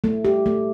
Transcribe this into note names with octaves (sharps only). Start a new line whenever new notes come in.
A3
G4
A3